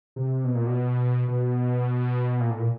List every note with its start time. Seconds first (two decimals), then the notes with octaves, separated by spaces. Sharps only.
0.16 C3
0.44 B2
0.55 A#2
0.67 B2
1.28 B2
2.40 A#2
2.50 A2
2.59 A#2